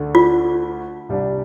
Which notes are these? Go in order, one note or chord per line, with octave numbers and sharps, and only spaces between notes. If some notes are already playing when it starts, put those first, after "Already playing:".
Already playing: D2 D3 A3
F4
C2 C3 G3 D4